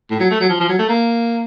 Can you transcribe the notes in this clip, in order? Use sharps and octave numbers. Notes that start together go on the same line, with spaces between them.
A2
F#3
A3
F#3
F3
F3
F#3
A3
A#3